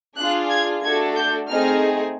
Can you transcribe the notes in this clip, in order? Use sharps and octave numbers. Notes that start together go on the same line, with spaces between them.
D4 F4 G#4 F#6
G#6
A3 D4 F#4 A4 G#6
G6
A3 C4 D#4 G#4 F6